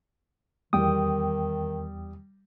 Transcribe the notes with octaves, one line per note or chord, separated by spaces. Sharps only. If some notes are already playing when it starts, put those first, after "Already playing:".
E2 D#3 G3 G5 D#6